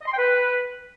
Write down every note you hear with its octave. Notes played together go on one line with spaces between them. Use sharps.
D#5
C6
G5
B4